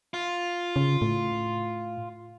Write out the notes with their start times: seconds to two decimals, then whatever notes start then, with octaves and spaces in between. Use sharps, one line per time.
0.14 F4
0.76 C#3
1.02 A2